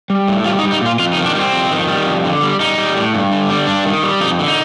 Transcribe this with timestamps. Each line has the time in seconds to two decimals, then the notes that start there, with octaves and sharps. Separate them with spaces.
0.10 G3
0.28 A2
0.45 G3 F4
0.59 D#4
0.63 G3
0.72 D#4
0.81 A#2 F4
0.99 F2 F4
1.13 D#4
1.17 D#3
1.26 D4
1.35 G3 C4
1.53 F2
1.71 D#3
1.88 G3
2.06 F2
2.24 D3
2.42 G3
2.60 G3 D#4
2.78 G3
2.96 A2
3.14 G2
3.31 D3
3.50 G3
3.67 G2 D4
3.85 D#3
4.03 G3
4.21 F2 D#4
4.39 D3
4.48 D#4